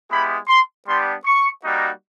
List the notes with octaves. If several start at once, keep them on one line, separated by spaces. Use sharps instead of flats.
G#3 B3 E4 G4 B5
C6
G3 B3 D4 G4 C6
C#6
G3 A#3 D#4 F#4